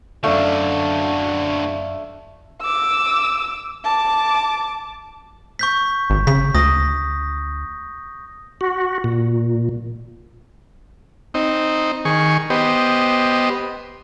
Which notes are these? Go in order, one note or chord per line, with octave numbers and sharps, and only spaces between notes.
F#2 D3 F#3 A3 D4 F5
D6 E6
A5 D6
C#6 G6 B6
G#1
C#3 B6
D2 D#6 A#6
F#4
A#2
C4 D#4
D#3 G#4 C#6
B3 G4 C5 D#5